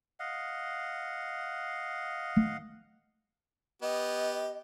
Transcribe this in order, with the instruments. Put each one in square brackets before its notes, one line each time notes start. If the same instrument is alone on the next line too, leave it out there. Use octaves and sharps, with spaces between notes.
[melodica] D#5 F5 F#5
[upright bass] D#3
[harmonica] B3 G4 [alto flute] D#5